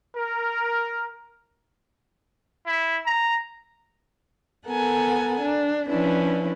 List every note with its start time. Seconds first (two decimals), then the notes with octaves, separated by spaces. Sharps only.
0.16 A#4
2.67 E4
3.06 A#5
4.67 B3 A4 A#4 F#5 G#5
5.41 D4
5.88 F3 C#4 D4 E4 B4